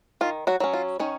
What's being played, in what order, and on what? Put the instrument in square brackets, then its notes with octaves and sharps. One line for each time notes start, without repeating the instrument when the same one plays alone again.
[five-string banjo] D#3 F4
F#3 F#4
F#3 C#4
F4
D#3 C#4 C#5